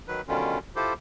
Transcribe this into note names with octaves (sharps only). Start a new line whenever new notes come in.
D#3 F#3 B4
B2 D3 D#3 G3 C#4 F4
E4 F4 G4 A4 C5